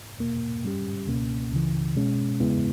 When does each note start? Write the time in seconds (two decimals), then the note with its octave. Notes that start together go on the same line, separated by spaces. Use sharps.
0.18 E2 B2 A#3
0.63 G2 G3 C#4 G4
1.07 C#2 B2 A#3 C#4
1.52 C#2 C#3 E3
1.96 B2 G#3 C#4
2.40 E2 C#3 G#3 B3 E4